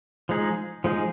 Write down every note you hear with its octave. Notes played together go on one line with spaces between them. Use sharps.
F3 G#3 D#4 G#4
F3 G#3 D#4 G#4